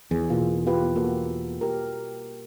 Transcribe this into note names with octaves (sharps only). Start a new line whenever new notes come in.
E2 G#4
B2 A#3 F4
F4 G4 B4
A#3 F#4 A4
G4 A#4